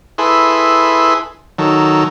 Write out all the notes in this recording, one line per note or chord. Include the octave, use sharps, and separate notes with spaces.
E4 G#4 A4 B4 C6
D#3 F#3 A4